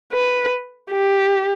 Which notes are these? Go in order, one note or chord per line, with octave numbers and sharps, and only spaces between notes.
B4
G4